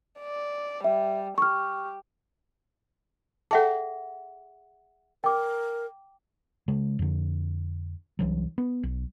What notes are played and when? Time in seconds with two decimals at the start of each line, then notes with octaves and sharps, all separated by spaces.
0.20 D5
0.84 G3 E5
1.38 G4 C#6 F6
3.51 G#4 A4 E5 F#5 G5 A5
5.24 A#4 G5 D6
6.68 C#3 G#3
6.99 F2 D3
8.19 C2 E3 F#3
8.58 B3
8.83 B1